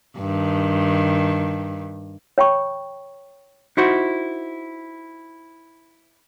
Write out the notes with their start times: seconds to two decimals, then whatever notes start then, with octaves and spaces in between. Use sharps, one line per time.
0.19 G2 D#3
2.38 C#5 G5 B5 C#6
3.77 D#4 E4 F#4 C5